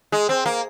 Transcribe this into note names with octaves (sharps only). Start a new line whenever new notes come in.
G#3
C4
A#3